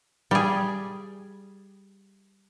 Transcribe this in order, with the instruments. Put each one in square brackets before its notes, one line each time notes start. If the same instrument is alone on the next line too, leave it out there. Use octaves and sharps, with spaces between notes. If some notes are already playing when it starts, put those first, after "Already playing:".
[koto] G3 G#4